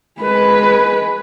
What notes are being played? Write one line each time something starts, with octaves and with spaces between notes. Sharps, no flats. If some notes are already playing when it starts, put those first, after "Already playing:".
G#3 B4